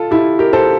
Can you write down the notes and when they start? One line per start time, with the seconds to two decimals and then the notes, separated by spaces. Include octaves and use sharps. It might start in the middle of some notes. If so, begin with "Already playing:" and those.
Already playing: F4 A4
0.11 E4 G4
0.39 G4 A#4
0.53 A4 C5